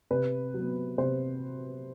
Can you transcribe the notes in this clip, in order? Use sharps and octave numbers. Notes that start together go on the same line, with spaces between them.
C3 B4
F#3
B3
C3 C5